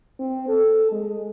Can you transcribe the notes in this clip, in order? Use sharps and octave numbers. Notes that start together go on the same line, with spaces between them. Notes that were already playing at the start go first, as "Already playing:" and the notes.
C4
A4
G#3